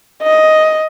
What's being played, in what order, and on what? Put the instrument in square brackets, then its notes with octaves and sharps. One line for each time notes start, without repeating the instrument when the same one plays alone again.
[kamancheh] D#5